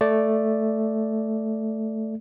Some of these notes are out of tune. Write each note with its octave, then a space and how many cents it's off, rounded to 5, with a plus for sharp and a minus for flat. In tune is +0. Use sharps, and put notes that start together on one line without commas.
A3 +0 D5 +0